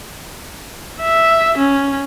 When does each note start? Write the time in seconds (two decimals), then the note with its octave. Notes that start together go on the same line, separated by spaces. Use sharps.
1.01 E5
1.58 C#4